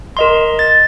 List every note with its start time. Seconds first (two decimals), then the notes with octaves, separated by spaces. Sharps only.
0.17 A#4 D#5 C6
0.59 A6